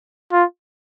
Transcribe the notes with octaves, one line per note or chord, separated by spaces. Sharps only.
F4